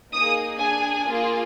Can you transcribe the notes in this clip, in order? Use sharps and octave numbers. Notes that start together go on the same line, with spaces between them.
A#3 D#4 G#4 D#6
D4 G#4 G#5
A#3 F4 G#4